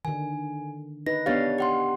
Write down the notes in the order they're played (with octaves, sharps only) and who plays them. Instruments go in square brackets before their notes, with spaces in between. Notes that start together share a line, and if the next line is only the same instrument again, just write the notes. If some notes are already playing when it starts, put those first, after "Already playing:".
[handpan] D3 D#3 [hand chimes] G#5
[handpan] D#4 B4 [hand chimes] A#6
[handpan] B3 D4 F5 [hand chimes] G4 C#5 A6
[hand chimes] G4 F#5 C6